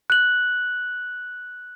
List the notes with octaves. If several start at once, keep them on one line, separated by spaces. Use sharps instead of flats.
F#6 F#7